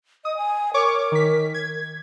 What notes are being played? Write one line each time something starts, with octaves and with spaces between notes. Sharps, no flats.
D#5 D#6
G#5
A#4 C#5 C#6 D6
D#3 B6
G#6